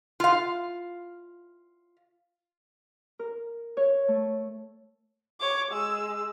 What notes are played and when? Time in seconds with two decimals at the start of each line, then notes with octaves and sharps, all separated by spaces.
0.20 F4 F5
3.19 A#4
3.77 C#5
4.08 A3
5.40 C#5 D6
5.71 G#3 E6